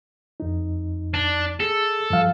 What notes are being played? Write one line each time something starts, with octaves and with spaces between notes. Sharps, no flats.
F2 D#4
D4
G#4 A4
G2 F3 F5